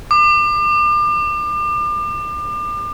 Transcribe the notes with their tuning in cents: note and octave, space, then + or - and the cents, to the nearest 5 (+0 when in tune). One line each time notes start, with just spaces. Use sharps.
D6 +35